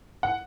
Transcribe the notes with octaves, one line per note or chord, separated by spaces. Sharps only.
F#5